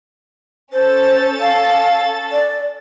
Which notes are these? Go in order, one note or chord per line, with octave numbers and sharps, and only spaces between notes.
C#4 A4 C5 A6
F5
D5